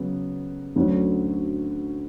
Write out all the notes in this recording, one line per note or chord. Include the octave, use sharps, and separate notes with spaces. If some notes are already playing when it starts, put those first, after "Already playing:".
Already playing: C#3 F#3 B3
D2 D3 F#3 C#4 F#4